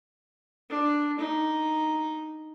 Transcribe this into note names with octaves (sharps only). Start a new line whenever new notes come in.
D4
D#4